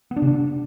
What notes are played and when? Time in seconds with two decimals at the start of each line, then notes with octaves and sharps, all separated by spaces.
0.11 B3
0.16 D4
0.22 C3
0.27 D4